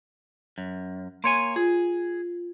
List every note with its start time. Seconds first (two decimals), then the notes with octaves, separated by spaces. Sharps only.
0.58 F#2
1.24 A#3 C#5 G#5 C6 C#7
1.56 F4 G#4